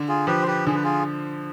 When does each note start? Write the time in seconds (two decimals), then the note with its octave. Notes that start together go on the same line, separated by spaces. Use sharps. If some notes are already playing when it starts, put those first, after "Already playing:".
Already playing: D3
0.08 F4 G#4
0.27 F3 G4 B4
0.42 C5
0.47 G4 B4
0.67 D3 G#4
0.75 B4
0.83 F4 G#4